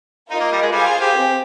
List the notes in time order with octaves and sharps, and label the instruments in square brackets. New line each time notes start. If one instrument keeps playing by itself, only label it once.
[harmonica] D#4 [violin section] F4 A#4 D#5
[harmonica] A#3
G3
G#3
[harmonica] G3 [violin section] G#4 C5 F5 G#5
[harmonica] F4
G4
[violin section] C4